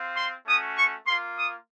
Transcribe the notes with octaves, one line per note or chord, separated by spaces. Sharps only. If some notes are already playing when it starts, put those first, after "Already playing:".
Already playing: C4 F4
C6
A3 C#4 F#4 D#6
C#6
A#3 F4 C6
D#6